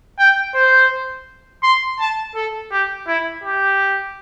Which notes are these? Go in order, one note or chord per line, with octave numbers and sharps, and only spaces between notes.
G5
C5
C6
A5
A4
G4
E4
G4